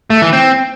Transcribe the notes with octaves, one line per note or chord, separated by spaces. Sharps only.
A3
E3
C4